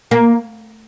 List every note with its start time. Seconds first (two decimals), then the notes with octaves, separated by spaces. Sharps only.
0.11 A#3